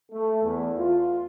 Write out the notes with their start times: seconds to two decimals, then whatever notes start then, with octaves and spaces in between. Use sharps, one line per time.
0.12 A3
0.43 E2
0.77 F4